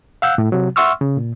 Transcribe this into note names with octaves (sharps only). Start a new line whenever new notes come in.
F5 F#5 E6 F#6 G6
A2
C3 F#3
E5 F#5 C6 C#6 E6 F6
C#3
A#2